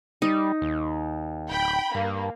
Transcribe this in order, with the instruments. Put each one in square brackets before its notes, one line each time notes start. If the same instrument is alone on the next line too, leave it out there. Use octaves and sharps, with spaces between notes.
[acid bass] G3 [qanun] D#4
[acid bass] D#2
[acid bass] D1 [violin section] G5 B5
[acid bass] G2 [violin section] A#3